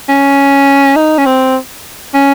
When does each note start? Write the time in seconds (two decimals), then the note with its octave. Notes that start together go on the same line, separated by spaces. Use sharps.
0.09 C#4
0.96 D#4
1.18 C#4
1.26 C4
2.14 C#4